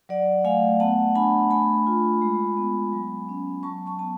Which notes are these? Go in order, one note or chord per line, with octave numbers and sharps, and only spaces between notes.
F#3 D5 F#5
A3 F5 G#5
B3 F#5 A5
D4 G#5 B5
A3 G#5 B5
F4
G#3
B3
F#3
C#4
F#3 A5 C#6
A5 C#6
B3 A5